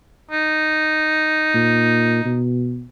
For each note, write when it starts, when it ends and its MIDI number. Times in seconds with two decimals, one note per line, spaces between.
0.31 2.46 63
1.54 2.20 46
2.25 2.86 47